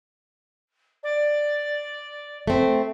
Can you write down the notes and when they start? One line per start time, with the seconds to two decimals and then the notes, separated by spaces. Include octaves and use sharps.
1.03 D5
2.47 A3 C4